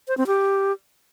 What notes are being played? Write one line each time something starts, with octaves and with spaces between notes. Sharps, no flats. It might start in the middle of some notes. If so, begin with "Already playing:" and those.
C5
C4
G4